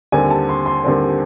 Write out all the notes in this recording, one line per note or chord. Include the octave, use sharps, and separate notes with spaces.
D#2 D3 G3 C4 G#5
A5
C6
C6
D#2 D3 G3 C4